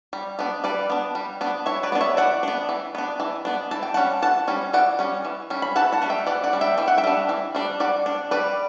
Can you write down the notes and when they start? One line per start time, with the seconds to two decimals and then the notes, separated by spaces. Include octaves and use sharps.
0.13 G3
0.39 B3 D4
0.64 G3 B4 D5
0.90 B3 D4
1.15 G3
1.41 B3 D4
1.66 E3 C#5 E5
1.83 B4 D5
1.92 B3
1.95 D4
2.01 C#5 E5
2.17 E3 D5 F#5
2.43 B3 D4
2.69 E3
2.95 B3 D4
3.20 E3
3.45 B3 D4
3.71 E3 A5
3.83 G5
3.94 G3 C#4 F#5 A5
4.22 E3 F#5 A5
4.48 G3 C#4
4.73 E3 D5 F#5
4.99 G3 C#4
5.25 E3
5.50 G3 C#4
5.62 B5
5.76 E3 F#5 A5
5.92 F#5 A5
6.02 G3 D4
6.10 E5 G5
6.27 E3 D5 F#5
6.44 D5 F#5
6.53 G3 D4
6.61 E5 G5
6.78 E3 G5
6.88 F#5
6.98 E5 G5
7.04 G3 D4
7.29 E3
7.55 G3 D4
7.80 G3 D5 F#5
8.06 D4
8.31 G3 B4 D5